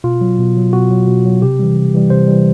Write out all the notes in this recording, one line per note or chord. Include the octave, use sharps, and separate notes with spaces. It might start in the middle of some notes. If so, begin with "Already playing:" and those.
B2 F4
F#3
B2
F#3
B2 F#4
F#3
B2
F#3
C3 G4
E3 G3
C3
E3 G3
C3 C5
E3 G3